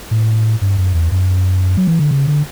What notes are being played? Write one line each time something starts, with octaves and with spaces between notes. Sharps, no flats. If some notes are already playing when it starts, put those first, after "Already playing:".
A2
G2
F#2
E2
F#2
F#3
E3
D3
C#3
D3